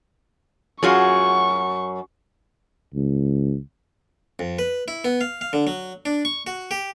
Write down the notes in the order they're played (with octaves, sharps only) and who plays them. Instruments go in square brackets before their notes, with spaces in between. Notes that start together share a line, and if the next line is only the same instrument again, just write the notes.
[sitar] F#2 [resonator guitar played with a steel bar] F4 F#4 G#4 [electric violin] C#6
[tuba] C#2
[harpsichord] F2
B4
E4
B3
F5
F5
D3
F#3
D4
C#6
F#4
G4